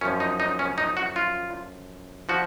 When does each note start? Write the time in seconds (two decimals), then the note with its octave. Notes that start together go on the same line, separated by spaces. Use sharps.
0.01 F#2 F3 C#4
0.20 D#4
0.40 D#4
0.59 C#4
0.78 D#4
0.97 F#4
1.16 F4
2.29 F3 F#4